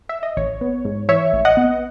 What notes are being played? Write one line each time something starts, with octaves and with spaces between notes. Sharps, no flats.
E5
D#5
A1 C#5
B3
G#2
E3 C#5 E5
A1
D#5 F#5
B3